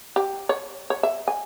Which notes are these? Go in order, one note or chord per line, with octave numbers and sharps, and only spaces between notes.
G4
C#5
C#5
E5
G#5